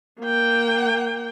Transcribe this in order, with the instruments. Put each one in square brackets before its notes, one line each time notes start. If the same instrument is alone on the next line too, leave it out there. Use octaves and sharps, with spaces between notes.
[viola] A#3 G5